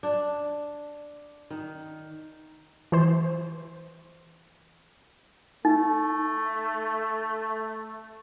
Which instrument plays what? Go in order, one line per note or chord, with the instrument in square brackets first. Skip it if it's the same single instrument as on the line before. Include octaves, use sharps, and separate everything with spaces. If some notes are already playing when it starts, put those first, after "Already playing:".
[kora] D4
D#3
[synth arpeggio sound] E3 C5
[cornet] A3 [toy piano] D#4